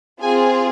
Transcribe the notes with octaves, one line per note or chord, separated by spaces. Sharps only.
C4 F4 G#4 G#5